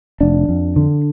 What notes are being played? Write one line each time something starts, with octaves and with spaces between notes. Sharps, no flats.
F1 D4
F2
D3